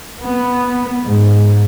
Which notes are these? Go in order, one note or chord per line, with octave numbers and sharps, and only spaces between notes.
B3
G#2